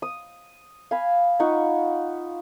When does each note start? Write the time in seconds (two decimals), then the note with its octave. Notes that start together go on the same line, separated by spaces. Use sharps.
0.02 D#6
0.91 F5 G#5 B5
1.40 D#4 F4 F#5 C#6